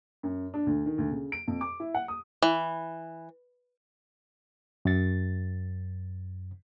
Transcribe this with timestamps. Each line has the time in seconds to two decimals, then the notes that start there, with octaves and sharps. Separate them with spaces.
0.23 F#2
0.54 D4
0.67 D2
0.86 D#3
0.98 D2
1.11 C#3
1.32 D7
1.48 F2
1.61 D6
1.80 E4
1.95 F#5
2.08 D#6
2.42 E3
4.85 F#2 A6